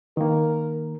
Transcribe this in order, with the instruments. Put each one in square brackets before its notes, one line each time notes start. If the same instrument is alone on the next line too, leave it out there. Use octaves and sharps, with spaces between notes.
[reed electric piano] D#3 A#3 [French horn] A#4